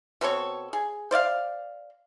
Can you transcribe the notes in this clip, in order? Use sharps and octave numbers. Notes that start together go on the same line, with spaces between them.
B2 C4 A4 C#5
G#4
C5 D5 E5 F5